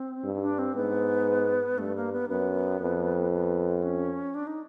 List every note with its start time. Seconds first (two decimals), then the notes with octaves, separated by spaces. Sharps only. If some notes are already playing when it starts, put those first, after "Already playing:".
Already playing: C4
0.24 G2
0.36 D#4
0.42 D4
0.59 C4
0.76 G#2 B3
1.78 G2 A3
1.96 A#3
2.13 B3
2.29 F#2 B3
2.80 F2
3.32 B3
3.83 C#4
4.35 D4
4.47 D#4